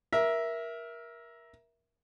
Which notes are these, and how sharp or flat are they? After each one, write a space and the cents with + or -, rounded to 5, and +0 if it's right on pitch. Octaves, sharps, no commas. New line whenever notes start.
A#4 +20 E5 +0